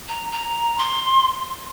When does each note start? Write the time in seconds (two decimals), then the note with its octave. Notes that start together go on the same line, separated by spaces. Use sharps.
0.08 A#5
0.32 A#5
0.78 C6